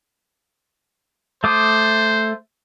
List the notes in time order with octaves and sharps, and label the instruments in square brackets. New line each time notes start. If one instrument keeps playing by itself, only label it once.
[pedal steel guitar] A3 D6 D#6 [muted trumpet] C5